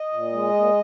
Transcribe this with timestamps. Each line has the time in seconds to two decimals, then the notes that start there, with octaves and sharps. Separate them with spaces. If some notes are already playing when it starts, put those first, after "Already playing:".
Already playing: D#5
0.13 A#2
0.32 G#3
0.53 A#2